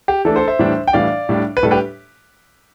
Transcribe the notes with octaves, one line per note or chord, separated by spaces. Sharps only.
G4
E3 A3 D4 A4
A4 C5
C5 E5
A2 E3 G3 D4
G5
A2 E3 G3 D4 D5 F5
A2 G3 D4
B4
A2 G3 D4 A4
G4 B4